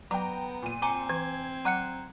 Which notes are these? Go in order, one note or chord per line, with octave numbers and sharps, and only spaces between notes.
F#3 B3 G5 A#5
A#2 D#7
C4 G#5 A#5 D6
E3 G#6
F#3 F#5 A#5 F#6 C#7